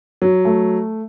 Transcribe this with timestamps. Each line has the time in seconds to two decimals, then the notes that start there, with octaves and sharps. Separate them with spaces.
0.22 F#3
0.45 A3